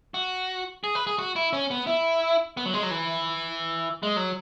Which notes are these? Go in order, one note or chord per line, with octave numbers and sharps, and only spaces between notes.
F#4
G#4
B4
G#4
F#4
E4
C#4
B3
E4
B3
F#3
G#3
F#3
E3
G#3
F#3